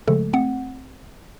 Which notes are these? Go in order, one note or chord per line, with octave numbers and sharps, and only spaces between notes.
C#3 F3 G#3 A3 A4
A3 C4 F#5